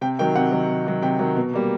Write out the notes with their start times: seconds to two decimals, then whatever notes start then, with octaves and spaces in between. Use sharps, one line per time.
0.01 C3 G5
0.19 D#3 F#3 G5
0.35 C3 F#5
0.52 D#3 F#3
0.69 C3
0.86 D#3 F#3
1.02 C3 G5
1.19 D#3 F#3
1.37 B2
1.54 G3 A#3